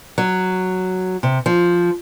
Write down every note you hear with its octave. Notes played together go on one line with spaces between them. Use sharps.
F#3
C3
F3